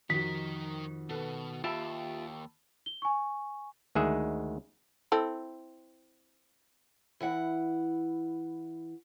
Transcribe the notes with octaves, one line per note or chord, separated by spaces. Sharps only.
F2 D#3 D#4 F#4 A#4 B6
B2 A4 B4
D#2 F4 G4 E5 A5 B5 E6
G7
G#5 C#6
D2 D#3 G#3 G#4 E5 F#5
C4 E4 A4
E3 E4 F#5